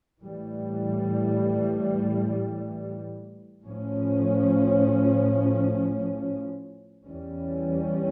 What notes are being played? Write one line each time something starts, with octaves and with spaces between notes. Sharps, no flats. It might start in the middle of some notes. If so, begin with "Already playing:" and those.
A2 E3 G3
A2 F3 C#4
E2 E3 G3 C#4